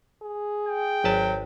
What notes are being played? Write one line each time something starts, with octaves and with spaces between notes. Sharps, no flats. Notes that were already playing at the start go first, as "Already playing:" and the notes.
G#4
G5
G#1 F#3 B4 A5